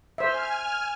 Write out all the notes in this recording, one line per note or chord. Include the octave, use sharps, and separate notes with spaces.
C5 E5 G#5 F6